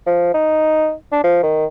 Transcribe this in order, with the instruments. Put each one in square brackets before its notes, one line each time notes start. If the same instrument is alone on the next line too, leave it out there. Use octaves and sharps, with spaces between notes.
[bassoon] F3
D#4
D4
F3
D#3